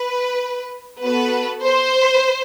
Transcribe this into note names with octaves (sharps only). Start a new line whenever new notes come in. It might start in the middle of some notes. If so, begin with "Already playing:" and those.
Already playing: B4
B3 F#4 A4 B4
C5